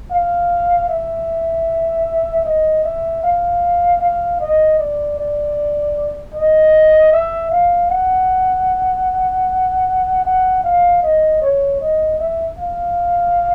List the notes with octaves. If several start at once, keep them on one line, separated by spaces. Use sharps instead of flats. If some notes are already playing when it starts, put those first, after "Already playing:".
F5
E5
D#5
E5
F5
F5
D#5
D5
D5
D#5
E5
F5
F#5
F#5
F5
D#5
C#5
D#5
E5
F5